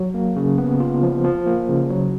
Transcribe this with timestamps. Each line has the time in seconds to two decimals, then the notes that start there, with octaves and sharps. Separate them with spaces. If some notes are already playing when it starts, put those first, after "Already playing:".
Already playing: F#3
0.14 A#3
0.36 C#3
0.58 B3
0.80 F4
1.03 F3
1.25 F3
1.47 A#3
1.69 C#3
1.90 F#3